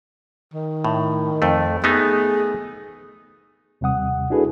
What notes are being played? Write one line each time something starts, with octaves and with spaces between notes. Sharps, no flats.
D#3
A2
F2 A3
A3 B3 D#4 G#4
D#2 C3 G3 F#5 D#6
D4 E4 F#4 G#4 A4 B4